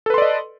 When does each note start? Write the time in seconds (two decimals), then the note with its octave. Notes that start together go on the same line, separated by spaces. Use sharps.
0.06 A4
0.10 B4
0.14 C6
0.18 D5
0.22 D#5